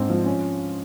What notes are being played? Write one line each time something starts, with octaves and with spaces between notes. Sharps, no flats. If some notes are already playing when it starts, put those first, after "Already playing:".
Already playing: G#2 C4 D4
F3
C#4